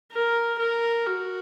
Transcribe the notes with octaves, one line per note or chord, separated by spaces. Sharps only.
A#4
A#4
F#4